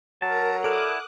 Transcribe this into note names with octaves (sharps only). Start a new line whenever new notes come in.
F#3 A#4 A5 A#5
E4 A4 D5 F#5 D6 D#6 F6 F#6